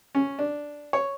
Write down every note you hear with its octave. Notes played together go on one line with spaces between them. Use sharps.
C#4
D4
C#5